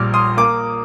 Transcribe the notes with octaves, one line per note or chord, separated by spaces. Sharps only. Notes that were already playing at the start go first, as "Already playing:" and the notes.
Already playing: A#1 A#2 G3 D6 F6
C6 D#6
A#3 D6